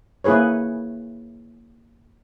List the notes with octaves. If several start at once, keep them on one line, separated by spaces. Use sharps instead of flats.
A#3 E4 G#4 B4 C#5